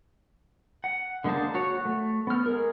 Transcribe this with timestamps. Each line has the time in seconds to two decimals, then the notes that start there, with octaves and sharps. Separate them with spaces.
0.84 F#5
1.24 D3 G#3 A#3 C5 A5
1.54 F#4 C#5
1.85 A3
2.27 B3 F6
2.46 G#3 A#4